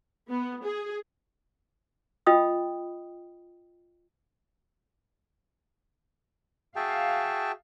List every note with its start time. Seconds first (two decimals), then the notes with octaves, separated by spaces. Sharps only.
0.29 B3
0.64 G#4
2.26 F4 D#5 G5 B5 D#6
6.76 F#4 G#4 E5 F5 G5 A5